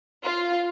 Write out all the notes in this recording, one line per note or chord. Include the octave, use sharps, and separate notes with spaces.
F4